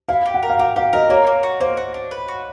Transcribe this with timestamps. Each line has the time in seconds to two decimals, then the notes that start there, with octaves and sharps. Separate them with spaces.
0.08 E4 F5
0.26 G4
0.34 F#5
0.43 A#4
0.50 F5
0.59 G4 F#5
0.76 G4 F5
0.93 A#4 D#5
1.10 A#3 C#5
1.27 A#3
1.43 F#4
1.60 A#3 C5
1.77 F#4
1.94 D4
2.11 B4
2.28 F#4